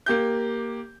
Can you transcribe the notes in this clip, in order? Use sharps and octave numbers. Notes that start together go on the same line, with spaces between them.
A#3 G4 G6